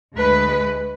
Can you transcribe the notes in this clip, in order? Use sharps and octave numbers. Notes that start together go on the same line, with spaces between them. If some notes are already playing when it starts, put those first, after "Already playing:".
D2 G#3 B4